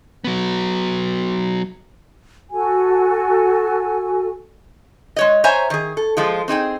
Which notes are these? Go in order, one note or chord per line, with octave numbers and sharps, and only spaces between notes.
F#3 B3
F#4 A4 G#5
G#3 C#5 D#5
C5 C#5 E5 G#5 A#5
D#3 G#4
A4
F3 G#3 F4
C4 D#4 G#4 G5